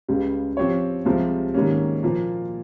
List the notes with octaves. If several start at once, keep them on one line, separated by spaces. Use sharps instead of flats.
C#2 C#3 G3
F3 C4 G4 C#5
C2 C3 F3 G#3
G#2 D#3 G3 A#3 C#4
A#2 F3 A#3 F4